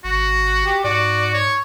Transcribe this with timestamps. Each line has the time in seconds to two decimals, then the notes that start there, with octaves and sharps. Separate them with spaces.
0.04 G#1 F#4
0.65 G4
0.84 G#2 F#4 D5
1.34 C#5